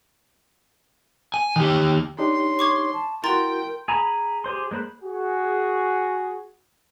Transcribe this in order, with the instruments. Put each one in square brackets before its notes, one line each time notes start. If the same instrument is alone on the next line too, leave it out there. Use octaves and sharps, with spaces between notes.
[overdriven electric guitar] G#5
D#3 G4
[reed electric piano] D4 D#4 G4 [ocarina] C#5 [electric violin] C6
[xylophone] C#6 D6 G#6
[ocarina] A5
[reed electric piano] E4 F#4 [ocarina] A#4 [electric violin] G5 [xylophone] A#5 C6 A6
[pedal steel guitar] G#4 G#5 A#5 B5
G4 G#4 C5 C6
G#3 A#3 C5 B5 F#6
[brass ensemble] F#4 G#4